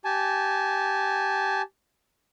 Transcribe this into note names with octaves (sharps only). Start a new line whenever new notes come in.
G4 G#5 A5